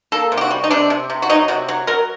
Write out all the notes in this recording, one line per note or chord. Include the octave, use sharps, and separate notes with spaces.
A#3 A4
C3
G4
F#4
G3
D#4
C3 D4
C3
C3
F#4
F#3 D#4
C3 F#4
F#3
F#3 A#4